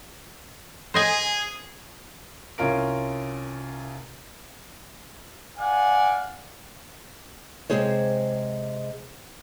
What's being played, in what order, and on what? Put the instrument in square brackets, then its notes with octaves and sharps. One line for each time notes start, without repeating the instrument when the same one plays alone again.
[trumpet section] G#4 [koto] C5 D#5 G#5
[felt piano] C2 C#4 F4 A#4 D7
[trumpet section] D5 F5 F#5 G#5
[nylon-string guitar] C3 F3 G#3 G#4 C5 C#5